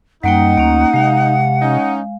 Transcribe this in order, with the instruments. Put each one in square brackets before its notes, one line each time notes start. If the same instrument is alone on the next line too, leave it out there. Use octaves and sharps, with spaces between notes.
[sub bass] F#2 [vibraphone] G3 A#3 G5 [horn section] D#4 [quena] F#5
[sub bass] D2 [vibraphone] A#3 C#4
[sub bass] C3 [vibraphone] G#3 F5
[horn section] C#4 D#4